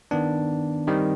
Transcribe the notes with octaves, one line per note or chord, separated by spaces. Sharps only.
D#3 B3 D4
D#3 G3 C4